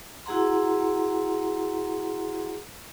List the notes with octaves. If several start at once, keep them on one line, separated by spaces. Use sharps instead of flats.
E4 F#4 G#4 F#5 A#5 C6